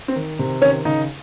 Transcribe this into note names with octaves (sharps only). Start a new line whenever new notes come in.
C4
D#3
C3
D#3 C#4
C#3 D#4